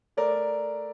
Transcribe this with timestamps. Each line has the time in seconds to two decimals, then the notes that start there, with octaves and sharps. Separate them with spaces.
0.17 A3 A#4 D5